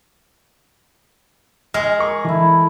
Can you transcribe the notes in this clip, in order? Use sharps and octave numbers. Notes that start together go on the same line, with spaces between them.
G#3 D#5 G#5 F6
A#4 C#6
E3 A3 E4